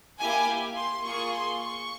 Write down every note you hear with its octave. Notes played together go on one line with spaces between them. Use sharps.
A#3 E4 G4 G#5
C6
A#3 F4 G#4 C#6
C6
C#6